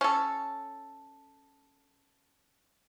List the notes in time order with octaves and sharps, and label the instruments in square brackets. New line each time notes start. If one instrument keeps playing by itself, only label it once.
[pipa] C#4 A4